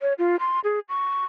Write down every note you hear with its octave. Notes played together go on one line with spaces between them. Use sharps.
C#5
F4
C6
G#4
C#6